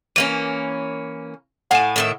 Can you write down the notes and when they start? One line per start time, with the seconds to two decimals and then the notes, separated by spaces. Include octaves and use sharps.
0.16 E3 A#3 C#4 D#7
1.71 A2 F5 F#5 G#5 E7
1.96 A2 D#3 E5